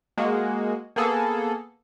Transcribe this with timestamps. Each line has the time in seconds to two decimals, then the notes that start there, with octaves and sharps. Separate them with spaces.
0.17 G#3 A#3 F#4
0.96 A#3 B3 G#4 A4